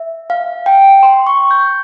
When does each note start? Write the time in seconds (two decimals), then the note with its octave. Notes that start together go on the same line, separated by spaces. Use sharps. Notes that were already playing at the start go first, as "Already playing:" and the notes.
Already playing: E5
0.30 F5
0.66 G5
1.03 C6
1.27 C#6
1.51 G6